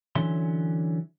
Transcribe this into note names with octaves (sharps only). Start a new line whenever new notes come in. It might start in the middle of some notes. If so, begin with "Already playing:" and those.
D3 E3 F#3 C#4 E5 C6